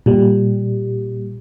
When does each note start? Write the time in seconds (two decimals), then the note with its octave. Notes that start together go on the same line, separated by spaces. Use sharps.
0.06 A#2 G3